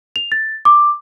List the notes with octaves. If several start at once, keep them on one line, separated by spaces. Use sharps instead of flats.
F7
A6
D6